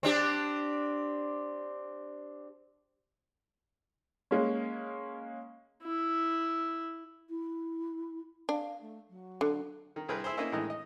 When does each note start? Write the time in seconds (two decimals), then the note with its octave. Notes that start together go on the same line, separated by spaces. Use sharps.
0.03 C4 D4 G4
4.31 G#3 A#3 C#4
5.83 E4
7.29 E4
8.49 D4 F5
8.81 A3
9.09 F#3
9.41 D3
9.96 D#3
10.09 C2 G#4 A#4 B4 G5
10.24 E4 G#4 C5
10.37 A#3 C#4 D#4 E4 G#4
10.52 A2 D#3 E3 G#3 D#5
10.70 D#5